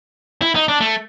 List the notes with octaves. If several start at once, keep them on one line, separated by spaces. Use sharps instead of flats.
E4
D#4
D4
A3